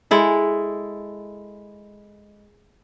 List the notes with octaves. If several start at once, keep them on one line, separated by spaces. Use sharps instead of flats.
G#3 E4 A4